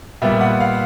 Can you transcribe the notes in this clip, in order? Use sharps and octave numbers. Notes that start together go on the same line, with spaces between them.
A#2 G3 B3 E5
F#5
F5